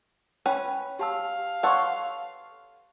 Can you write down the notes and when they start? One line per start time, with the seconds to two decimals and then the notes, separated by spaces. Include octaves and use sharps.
0.46 C#4 B4 G5 B5
0.99 G4 F5 A5 E6
1.63 A4 B4 C#5 F#5 C6 C#6